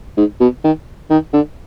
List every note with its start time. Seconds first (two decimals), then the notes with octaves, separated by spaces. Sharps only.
0.17 G#2
0.40 B2
0.64 D#3
1.10 D#3
1.33 D3